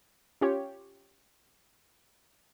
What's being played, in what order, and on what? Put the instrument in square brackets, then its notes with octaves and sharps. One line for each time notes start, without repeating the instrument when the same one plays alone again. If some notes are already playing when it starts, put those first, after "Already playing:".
[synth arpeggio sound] C#4 F4 G4 C#5